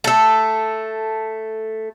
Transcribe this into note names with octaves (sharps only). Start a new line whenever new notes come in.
A3 A4